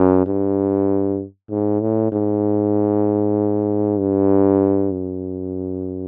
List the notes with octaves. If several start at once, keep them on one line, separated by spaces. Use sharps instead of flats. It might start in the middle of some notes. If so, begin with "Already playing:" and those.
Already playing: F#2
G2
G#2
A2
G#2
G2
F#2